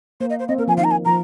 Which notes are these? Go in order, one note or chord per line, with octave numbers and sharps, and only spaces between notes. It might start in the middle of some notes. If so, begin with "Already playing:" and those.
A#3 C5
D#5
C5
C4 D#5
A#3 A#4
F3 G#5
D#3 F5
A#5
G#5
F3 A#5